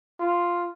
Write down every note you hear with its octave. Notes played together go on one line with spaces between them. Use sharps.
F4